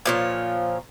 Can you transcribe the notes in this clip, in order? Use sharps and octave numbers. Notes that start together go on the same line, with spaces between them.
A#2 F3 C#5